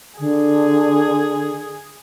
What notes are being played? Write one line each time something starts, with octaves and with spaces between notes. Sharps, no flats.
D3 G#4